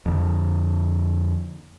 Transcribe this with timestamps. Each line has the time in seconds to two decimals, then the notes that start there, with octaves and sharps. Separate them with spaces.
0.06 F2 D3